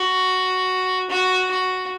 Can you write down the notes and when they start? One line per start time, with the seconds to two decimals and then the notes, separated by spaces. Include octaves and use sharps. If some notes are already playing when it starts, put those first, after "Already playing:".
Already playing: F#4
1.10 F#4
1.51 F#4